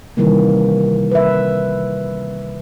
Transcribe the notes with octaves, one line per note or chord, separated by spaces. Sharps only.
C3 D#3 E3 G3 A#3
B4 E5